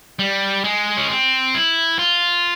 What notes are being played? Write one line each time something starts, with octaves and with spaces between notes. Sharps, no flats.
G3
G#3
C#4
C4
E4
F4